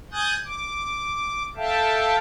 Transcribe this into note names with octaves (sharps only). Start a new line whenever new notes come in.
G#5 D#6 F#6 G6 A6
D6
A4 E5 F5 G5 A5